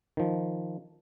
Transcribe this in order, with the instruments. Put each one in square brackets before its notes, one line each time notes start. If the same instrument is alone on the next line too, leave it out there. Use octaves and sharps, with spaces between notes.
[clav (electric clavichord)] D#3 F3